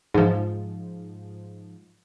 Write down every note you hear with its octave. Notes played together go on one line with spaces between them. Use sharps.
G#2 F3